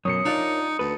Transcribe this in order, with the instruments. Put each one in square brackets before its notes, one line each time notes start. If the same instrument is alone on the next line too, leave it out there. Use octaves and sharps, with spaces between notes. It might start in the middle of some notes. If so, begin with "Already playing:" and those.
[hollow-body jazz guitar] F#2 B2 [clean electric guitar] A#4 C#5 [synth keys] D#6 C#7
[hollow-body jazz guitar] D4 F4 D5 [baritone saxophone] D#4
[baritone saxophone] D2 [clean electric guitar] A4 [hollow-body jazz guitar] B4